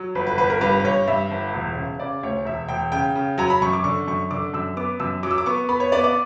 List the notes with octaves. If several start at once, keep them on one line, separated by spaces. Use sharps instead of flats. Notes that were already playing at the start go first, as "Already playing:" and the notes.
Already playing: F#3
G1 B4
B4
G1 B4
A#4
G2 B4
B4
G2 C#5
G2 E5
G1
E1
C#3
C#3 D5
D2 C#5
E1 E5
E1 G5
C#3 G5
C#3
F#3 A#5
B5
F#2 C#6
D6
D3 C#6
F#2 C#6
D3 D6
F#2 E6
B3 D6
F#2 E6
F#3 D6
E6
D6
B3 C#6
B3 B5
C#5
B3 D5
D5